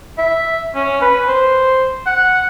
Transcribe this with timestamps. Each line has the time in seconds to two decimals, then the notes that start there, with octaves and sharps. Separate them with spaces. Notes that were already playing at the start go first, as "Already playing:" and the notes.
0.18 E5
0.75 C#4
1.01 B4
1.28 C5
2.06 F#5